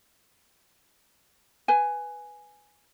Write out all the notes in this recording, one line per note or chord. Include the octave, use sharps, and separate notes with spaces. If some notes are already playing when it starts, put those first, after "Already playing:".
B4 G#5